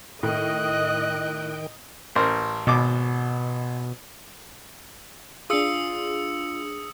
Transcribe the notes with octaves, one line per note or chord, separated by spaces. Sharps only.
A2 D#3 D#5 G5 F#6
A1 A#4 C5
G#1 B2 D6
D4 F4 G#4 D#6 E6 C#7